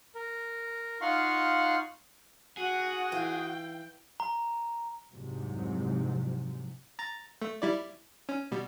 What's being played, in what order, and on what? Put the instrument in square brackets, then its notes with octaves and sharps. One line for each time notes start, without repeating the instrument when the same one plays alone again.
[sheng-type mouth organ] A#4
D#4 F4 F5 F#5 C6 C#6
[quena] F#4 [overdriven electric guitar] G#4 [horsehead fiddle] F#5
[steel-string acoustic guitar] E3 F5 [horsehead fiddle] G5
[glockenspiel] A#5
[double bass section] C2 F2 G#2 C3 F#3
[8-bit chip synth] A#5 A6
A3
G3 E4 D5
C#4
B2 G3